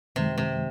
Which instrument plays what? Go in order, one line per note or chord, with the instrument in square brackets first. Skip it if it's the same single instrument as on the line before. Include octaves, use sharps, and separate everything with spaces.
[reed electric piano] F#2 D#3 G#3 [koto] C3
[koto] C3